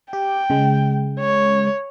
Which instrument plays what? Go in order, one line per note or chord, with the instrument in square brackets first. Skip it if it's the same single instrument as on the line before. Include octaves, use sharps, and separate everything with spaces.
[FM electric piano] G4 [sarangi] G5
[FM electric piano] C#3 G#3
[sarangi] C#5